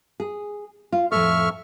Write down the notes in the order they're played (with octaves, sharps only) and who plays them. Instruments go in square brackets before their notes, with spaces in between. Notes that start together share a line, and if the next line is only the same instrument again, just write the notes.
[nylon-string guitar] G#4
F4
[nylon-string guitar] F2 A2 A4 [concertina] E5 C#6 F6